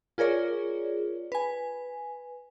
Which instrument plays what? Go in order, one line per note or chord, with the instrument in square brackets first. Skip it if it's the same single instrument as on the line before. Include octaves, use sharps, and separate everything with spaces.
[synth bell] F4 G#4 A#4 C#5 D5
B4 G#5